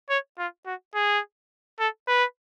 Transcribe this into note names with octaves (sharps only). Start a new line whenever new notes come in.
C#5
F4
F#4
G#4
A4
B4